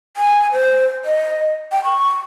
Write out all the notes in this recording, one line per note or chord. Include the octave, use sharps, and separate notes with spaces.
G#5
C5
D#5
G5
C#6